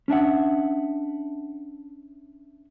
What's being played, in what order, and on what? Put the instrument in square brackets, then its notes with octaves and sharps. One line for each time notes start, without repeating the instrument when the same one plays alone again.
[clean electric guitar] C#4 D4 E5 F#5